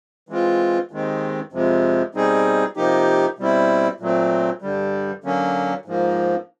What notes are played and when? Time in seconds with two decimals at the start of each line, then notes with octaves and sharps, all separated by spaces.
0.29 E3 G#3 C4 F4
0.91 D#2 D#3 G#3 C4
1.53 F2 C3 F3 G#3
2.15 B2 G3 C4 D#4 G#4
2.76 C3 F3 A#3 D#4 G4
3.38 B2 G3 C4 E4
4.00 A#2 F#3 A3 C4
4.62 G2 D3 G3
5.24 D3 F#3 A#3 C#4
5.85 G#2 F3 A#3